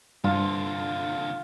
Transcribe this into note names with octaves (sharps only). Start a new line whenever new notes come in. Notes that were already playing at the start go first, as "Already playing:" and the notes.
C2 G2 D3 F4